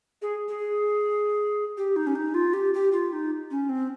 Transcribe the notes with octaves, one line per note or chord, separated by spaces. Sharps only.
G#4
G#4
G4
D#4
C#4
D#4
F4
G4
G4
F4
D#4
C#4
C4